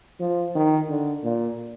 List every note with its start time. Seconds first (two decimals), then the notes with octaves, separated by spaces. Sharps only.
0.20 F3
0.55 D#3
0.89 D3
1.24 A#2